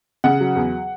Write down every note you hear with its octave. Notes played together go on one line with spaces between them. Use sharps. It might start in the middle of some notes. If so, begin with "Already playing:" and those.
C#3 F#5
F#3
E2